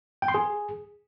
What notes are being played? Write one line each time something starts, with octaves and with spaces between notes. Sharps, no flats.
G5
C6
G#4